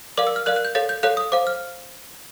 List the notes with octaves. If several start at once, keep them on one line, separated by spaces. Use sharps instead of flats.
A#4 D5 F5 D6
E6
F6
A#4 D5 F5 F#6
F#6
G6
A4 C#5 F5 A6
G6
A4 C#5 F5 F#6
D#6
C5 F5 D6
F6